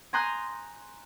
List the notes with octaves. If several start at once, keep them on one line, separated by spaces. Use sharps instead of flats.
G#5 A#5 C6 D#6 F#6 G6